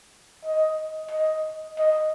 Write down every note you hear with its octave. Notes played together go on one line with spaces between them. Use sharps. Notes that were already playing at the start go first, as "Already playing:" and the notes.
D#5
D#5
D#5